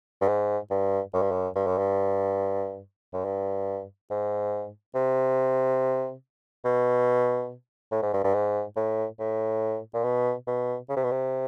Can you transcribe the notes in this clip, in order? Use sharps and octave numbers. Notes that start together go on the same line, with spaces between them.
G2
G#2
G2
F#2
G2
F#2
G2
F#2
G2
F#2
G2
G#2
C3
B2
A2
G#2
G2
G2
G#2
A2
A2
A#2
B2
B2
C#3
C3
B2
C3